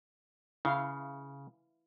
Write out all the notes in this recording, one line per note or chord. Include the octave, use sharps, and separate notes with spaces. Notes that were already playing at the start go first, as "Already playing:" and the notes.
C#3 E4 F5